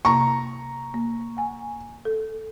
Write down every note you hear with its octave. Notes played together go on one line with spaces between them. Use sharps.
C3 A#3 A#5 C#6
A#3
F#5 G#5
A4